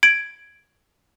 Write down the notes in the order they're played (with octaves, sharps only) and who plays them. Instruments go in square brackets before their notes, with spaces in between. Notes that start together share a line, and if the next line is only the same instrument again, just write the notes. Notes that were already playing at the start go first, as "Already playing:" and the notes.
[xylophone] G#6 D7 F#7